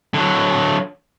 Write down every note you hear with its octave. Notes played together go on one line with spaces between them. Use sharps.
D3 F#3